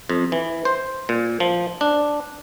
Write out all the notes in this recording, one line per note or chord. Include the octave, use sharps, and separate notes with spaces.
F2
E3
C5
A#2
F3
D4